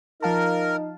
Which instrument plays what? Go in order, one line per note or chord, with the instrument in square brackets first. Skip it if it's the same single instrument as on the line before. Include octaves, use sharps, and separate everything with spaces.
[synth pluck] F3 F5 A5 [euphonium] D#4 [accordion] A#4